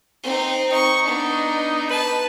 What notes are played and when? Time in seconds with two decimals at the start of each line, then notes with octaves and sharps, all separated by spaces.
0.23 C4 D#4
0.72 D#4 C#6
1.04 B3 D4
1.91 B4 A5